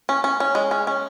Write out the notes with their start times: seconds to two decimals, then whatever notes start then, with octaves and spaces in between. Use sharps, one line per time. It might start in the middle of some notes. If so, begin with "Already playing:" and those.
0.09 C#4
0.24 C#4
0.40 C#4
0.55 G#3
0.71 C#4
0.87 C#4